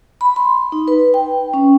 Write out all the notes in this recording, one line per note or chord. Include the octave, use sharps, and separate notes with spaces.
B5
C6
D#4
B4
G5
C#4